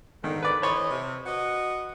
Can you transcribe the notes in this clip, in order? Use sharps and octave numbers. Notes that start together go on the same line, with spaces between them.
G#2 D3 D#3
B4 D5
E3 C5 C#5 D#5 B5
C3
F#4 B4 D#5